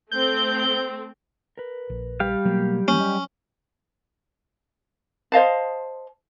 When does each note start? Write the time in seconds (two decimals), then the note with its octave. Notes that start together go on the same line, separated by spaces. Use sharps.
0.11 A3 C4 G6
1.57 A#4 B4
1.90 A#1
2.20 G3 G4 F5
2.45 B2 F#3 A#3
2.88 E3 A#3 C#4
3.00 D5 D#5
5.32 C5 D#5 F5 A5